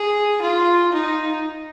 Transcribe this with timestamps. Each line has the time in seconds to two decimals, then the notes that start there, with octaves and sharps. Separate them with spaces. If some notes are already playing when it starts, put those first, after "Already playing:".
Already playing: G#4
0.42 F4
0.93 D#4